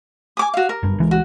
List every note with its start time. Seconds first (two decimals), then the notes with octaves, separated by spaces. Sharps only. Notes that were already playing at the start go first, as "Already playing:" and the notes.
0.37 G#5 D6 D#6
0.54 F#4 F5
0.69 A#4
0.83 F#1 G2
0.98 C#2 E3 G#3
1.11 F#4